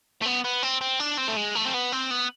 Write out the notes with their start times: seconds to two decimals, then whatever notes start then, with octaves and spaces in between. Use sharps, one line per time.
0.22 A3
0.26 B3
0.44 B3
0.63 C4
0.81 C4
1.00 D4
1.18 C4
1.28 A3
1.37 G#3
1.55 A3
1.65 C4
1.74 B3
1.92 C4
2.11 B3